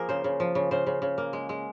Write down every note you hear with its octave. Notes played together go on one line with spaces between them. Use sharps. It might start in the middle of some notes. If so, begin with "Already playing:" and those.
Already playing: F3 A#3 G#4 A#4
C#3 C5
C#3
F3
C#3
C#3 C5
C#3
C#3
A#3
G#3
G#3